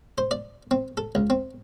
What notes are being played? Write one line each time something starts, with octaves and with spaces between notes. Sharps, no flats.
C5
D5
C4
A4
C#2
C4